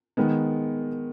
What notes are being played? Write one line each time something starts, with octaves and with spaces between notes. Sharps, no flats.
D#3 G#3 B3